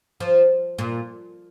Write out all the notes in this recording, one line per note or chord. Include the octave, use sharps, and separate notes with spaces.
F3
A#2